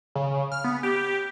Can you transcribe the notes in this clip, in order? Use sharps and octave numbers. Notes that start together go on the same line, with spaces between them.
C#3
F6
B3
G4